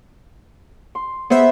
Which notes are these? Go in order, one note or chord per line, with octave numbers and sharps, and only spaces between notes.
C6
B3 G#4 C5 E5